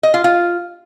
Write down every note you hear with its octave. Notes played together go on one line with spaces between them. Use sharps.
D#5
F4
F4